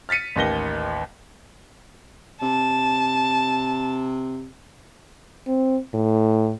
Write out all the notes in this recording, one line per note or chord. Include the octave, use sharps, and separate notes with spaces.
F6 A6 B6 C#7 D#7
A1 D#2 A#6 G7
C3 A5
C4
A2